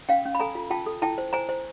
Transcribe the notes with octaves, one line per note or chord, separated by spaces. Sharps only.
C#4 F5 G5
C#4
B5
A4 G#5 A#5
F4
F4 G5 A5
A4
E4 G5 A5
C5
C5 G#5 A#5
C5